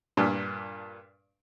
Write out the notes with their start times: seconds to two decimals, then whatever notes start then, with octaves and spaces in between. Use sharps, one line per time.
0.17 G2 A#2 D4